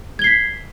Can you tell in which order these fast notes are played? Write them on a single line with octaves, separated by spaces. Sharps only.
G#6 G7 C7 B6